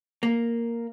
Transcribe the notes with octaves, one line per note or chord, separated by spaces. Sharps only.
A#3